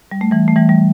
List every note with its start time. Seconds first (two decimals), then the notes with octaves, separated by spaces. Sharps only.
0.11 G3
0.21 A3
0.31 E3 G3
0.48 A3
0.56 E3 G3
0.69 G3